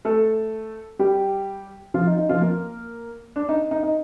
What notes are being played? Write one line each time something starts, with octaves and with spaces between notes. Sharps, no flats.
A3 A4
G3 G4
F3 F4
D#4
D#4
F3 F4
A#3 A#4
D4
D#4
D#4
D#4